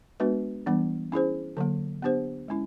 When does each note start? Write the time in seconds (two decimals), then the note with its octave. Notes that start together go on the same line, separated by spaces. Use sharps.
0.20 G#3 B3 D4 F#4 B4
0.67 E3 G3 B3 D4
1.12 C#4 E4 G#4 C5
1.57 D3 F#3 A#3
2.02 B3 D4 G4 C5
2.48 G#3 C#4 E4